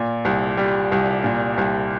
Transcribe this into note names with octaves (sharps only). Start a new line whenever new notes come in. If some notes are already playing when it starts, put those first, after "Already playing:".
Already playing: A#2
C2
G3
C2
A#2
C2